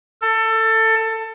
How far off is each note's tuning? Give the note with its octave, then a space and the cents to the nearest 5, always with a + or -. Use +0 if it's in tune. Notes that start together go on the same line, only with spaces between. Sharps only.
A4 +20